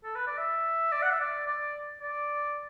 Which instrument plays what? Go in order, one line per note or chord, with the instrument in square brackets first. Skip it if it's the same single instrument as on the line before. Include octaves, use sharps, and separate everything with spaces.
[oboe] A4
B4
D5
E5
D5
F#5
E5
D5
D5
D5